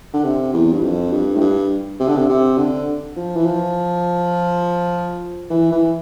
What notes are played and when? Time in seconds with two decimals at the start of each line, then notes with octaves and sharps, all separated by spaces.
0.14 D3
0.24 C3
0.54 E2
0.72 G2
0.83 F2
1.12 G2
1.36 A2
1.40 G2
2.00 C3
2.08 D3
2.17 C3
2.29 C3
2.58 D3
3.16 F3
3.36 E3
3.46 F3
5.50 E3
5.72 E3